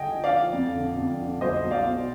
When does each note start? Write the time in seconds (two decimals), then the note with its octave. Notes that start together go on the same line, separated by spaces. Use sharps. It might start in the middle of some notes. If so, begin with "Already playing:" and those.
Already playing: D3 D#5 G5 G#5
0.09 F3
0.24 D5 F5
0.31 F3
0.53 F2
0.75 D3
0.97 F2
1.20 D3
1.41 B1 C5 D#5
1.64 B1
1.71 D5 F5
1.86 B2